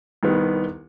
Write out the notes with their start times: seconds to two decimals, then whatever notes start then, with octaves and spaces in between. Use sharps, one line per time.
0.23 C2 D#3 B3